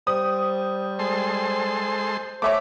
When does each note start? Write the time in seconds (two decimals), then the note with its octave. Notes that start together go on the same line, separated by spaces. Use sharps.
0.07 G3 C5 D#6
0.99 G#3 A4 C6
2.42 A3 C#5 E5 D6